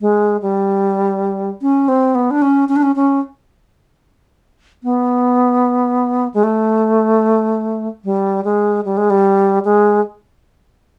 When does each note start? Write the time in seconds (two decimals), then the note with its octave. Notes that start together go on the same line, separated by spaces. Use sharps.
0.01 G#3
0.42 G3
1.62 C#4
1.89 C4
2.15 B3
2.31 D4
2.42 C#4
2.69 C#4
2.76 D4
2.83 C#4
2.96 C#4
4.84 B3
6.34 G#3
6.44 A3
8.05 G3
8.45 G#3
8.85 G3
8.97 G#3
9.10 G3
9.65 G#3